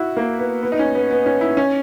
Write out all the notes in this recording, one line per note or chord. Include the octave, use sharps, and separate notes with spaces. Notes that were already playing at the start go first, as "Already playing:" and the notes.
Already playing: E4 F#4
A#3
B3
B3
D#4
C#4
B3
B3
C#4
E4
C#4